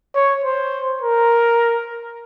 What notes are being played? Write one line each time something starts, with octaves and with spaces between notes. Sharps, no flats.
C#5
C5
A#4